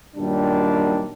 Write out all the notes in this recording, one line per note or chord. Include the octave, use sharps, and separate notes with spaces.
F#2 A#2 D#3 G3 D4